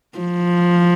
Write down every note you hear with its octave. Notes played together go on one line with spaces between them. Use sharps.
F3